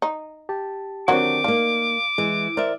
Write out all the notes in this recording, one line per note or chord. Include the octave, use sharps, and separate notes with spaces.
D#4
G4 A5
D3 D#3 F#3 C4 D4 F#4 D6
A#3 D4 D#4 F5
E3 G#3
A#4 C5 D5 E5 F6